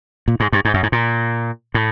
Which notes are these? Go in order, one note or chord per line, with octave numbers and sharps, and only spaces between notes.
A#2
G#2
G2
G#2
F#2
G#2
A#2
A2